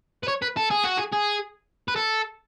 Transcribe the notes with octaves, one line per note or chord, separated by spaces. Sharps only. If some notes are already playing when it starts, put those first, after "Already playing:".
B4
C#5
B4
A4
G#4
F#4
G#4
G#4
B4
A4